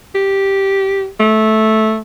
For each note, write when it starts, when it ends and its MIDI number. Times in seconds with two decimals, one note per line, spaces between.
0.15 1.07 67
1.20 1.99 57